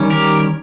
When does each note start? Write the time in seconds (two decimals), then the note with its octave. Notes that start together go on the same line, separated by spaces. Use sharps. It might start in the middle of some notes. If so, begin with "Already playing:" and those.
Already playing: D#3 G3 C#4
0.10 G4 A#4